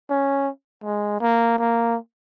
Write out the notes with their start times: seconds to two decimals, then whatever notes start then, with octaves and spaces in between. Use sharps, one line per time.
0.10 C#4
0.84 G#3
1.21 A#3
1.58 A#3